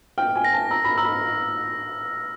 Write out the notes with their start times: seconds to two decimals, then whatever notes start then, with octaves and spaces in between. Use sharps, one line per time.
0.18 G5 F6
0.35 G#5
0.45 A#6
0.53 A5
0.71 A#5 E6
0.84 B5
0.98 A#5 E6
1.05 B5